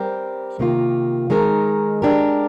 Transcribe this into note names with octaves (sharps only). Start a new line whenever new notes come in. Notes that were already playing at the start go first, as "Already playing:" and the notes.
Already playing: G3 C4 G4 A#4
C3 D#3 A#3 F4
D#3 G#3 D#4 A#4
G#3 D4 G4 A#4